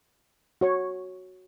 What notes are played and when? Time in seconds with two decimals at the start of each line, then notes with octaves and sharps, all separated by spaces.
0.61 F#4 C#5 C#6